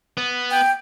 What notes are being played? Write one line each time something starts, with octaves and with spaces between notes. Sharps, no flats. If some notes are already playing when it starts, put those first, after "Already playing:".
B3
G5